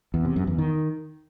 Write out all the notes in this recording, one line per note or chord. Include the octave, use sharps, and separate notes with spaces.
E2
C3
F#2
E2
D#3